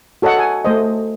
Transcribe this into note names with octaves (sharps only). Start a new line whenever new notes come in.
F#4 A4 C#5 D#5 F#5
G#5
A3 C5 D#5